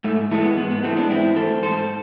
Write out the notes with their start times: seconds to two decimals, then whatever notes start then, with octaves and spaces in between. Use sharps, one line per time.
0.04 G#2 A3
0.31 E3 G#3 A3
0.44 B3
0.57 G#2 B3
0.71 B3
0.84 E3 G#3 A3 C4
0.96 B3 D4
1.10 G#2 C4 E4
1.36 E3 A3 A4 C5
1.62 G#2 A4 C5